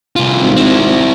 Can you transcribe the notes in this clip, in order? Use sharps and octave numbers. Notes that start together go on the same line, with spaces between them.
C2 F4
G#1
C4 E4